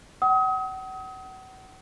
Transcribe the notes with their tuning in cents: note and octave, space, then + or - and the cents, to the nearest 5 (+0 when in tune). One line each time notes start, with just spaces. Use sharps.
F#5 +40 D#6 +35